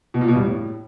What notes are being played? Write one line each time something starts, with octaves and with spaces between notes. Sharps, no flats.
B2
A#2
B2
G2
A2